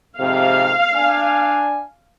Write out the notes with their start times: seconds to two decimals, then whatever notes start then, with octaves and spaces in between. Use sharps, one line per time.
0.20 F2 G#2 C3 F5
0.95 D4 G#5